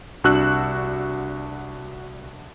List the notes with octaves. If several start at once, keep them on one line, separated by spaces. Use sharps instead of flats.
C2 D4 F#4 E6 F#6